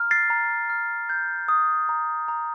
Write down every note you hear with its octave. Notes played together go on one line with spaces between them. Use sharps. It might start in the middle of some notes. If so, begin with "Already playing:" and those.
Already playing: A#5 F6
A6 C7
A#5
F6
G6
D#6
A#5
A#5